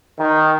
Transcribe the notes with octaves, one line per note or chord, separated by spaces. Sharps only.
D#3